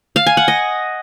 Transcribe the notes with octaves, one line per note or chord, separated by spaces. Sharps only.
F5
G#5
F#5
D#5